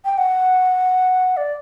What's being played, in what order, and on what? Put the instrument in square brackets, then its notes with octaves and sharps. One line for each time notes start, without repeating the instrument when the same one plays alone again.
[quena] G5
F#5
D5